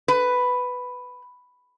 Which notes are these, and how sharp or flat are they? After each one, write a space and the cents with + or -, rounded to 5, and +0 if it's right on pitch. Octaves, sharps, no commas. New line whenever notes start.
B4 +5